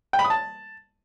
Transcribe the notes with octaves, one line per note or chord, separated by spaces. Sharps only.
G5
B5
D#6
A5